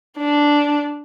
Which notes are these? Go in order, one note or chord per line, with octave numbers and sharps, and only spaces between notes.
D4